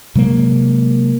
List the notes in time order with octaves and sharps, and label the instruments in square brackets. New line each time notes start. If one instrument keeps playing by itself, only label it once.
[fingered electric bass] C3 F#3 G#3 A#3